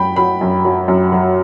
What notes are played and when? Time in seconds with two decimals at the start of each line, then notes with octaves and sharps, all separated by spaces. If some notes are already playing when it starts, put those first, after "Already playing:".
Already playing: F#2 F#3 G5 B5
0.16 F#3 B5
0.41 F#2
0.65 F#3
0.88 F#2
1.12 F#3